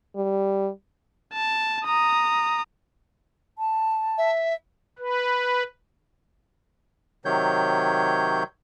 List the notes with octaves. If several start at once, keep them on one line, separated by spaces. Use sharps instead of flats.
G3
A5
A#5 D#6
A5
E5
B4
C3 D#3 F#3 C#5 G6